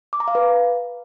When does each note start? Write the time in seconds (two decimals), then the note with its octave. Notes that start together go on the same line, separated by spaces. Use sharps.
0.13 D6
0.20 A#5
0.28 F5
0.35 B4